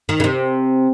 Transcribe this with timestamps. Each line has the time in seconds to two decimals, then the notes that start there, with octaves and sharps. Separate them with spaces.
0.09 D#3
0.20 C#3
0.24 C3